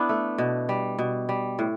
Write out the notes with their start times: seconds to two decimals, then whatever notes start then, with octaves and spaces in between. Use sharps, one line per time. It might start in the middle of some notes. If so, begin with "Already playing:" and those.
Already playing: B3 D4 E4
0.09 A3
0.38 B2
0.69 G3
0.99 B2
1.29 G3
1.59 A2